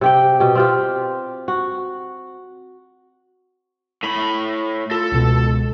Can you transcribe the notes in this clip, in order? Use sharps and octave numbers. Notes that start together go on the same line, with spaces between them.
C3 G4 G5
B2 G4
C4 F4 G4
F#4
A2 B5
F4 A4
C#2 B2